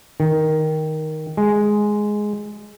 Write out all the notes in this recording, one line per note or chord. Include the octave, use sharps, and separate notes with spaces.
D#3
G#3